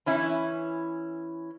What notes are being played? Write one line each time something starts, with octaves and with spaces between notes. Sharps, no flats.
E3 C#4 E4